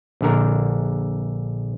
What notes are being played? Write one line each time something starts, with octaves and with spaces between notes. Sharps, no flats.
A#1 D3 A#4